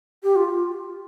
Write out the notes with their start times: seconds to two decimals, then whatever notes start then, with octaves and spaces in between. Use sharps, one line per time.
0.23 G4
0.36 F4